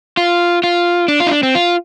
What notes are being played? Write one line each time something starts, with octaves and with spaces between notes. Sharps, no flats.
F4
F4
D4
F4
D#4
D4
C4
F4